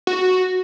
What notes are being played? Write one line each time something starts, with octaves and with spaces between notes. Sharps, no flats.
F#4